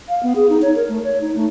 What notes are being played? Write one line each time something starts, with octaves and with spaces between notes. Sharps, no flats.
F5
B3
G#4
D#4
C#5
A#4
A3
C#5
D#4
A3